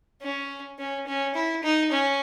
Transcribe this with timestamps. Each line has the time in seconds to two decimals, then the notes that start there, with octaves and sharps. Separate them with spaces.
0.21 C#4
0.79 C#4
1.07 C#4
1.35 E4
1.63 D#4
1.91 C#4